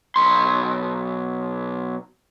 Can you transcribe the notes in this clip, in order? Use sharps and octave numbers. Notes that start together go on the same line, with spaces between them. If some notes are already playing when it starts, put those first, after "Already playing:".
B1 C6